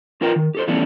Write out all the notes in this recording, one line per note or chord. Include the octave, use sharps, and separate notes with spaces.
D4 F4 A#4 B4 G5 A#5
D#3
G4 A4 C5
E3 G3 A3 B3 C#4 D4